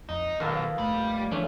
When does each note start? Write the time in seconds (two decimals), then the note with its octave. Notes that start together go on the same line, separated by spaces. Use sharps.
0.09 F2 D#4
0.40 B1 A#2 D#3 A#3 B3 A4 A#4
0.78 F1 F2 G3 A3
1.31 A#2 E3 F3 A3 C#4 D4